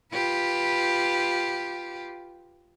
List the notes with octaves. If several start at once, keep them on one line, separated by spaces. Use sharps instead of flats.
F4 G4 B4